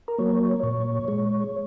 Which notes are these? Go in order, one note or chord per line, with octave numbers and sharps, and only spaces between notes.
A#4
F#3 A#3 C#5
A#2 C#5
G#3 C#5